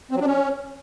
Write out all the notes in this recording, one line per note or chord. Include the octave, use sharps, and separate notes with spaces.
C4
F#3
D4
C#4